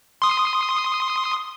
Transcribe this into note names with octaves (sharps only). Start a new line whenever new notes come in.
C6 D#6